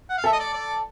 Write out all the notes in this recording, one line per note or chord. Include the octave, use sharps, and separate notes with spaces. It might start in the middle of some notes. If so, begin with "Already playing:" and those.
F#5
F5
A4 E5
D#5
D5
D5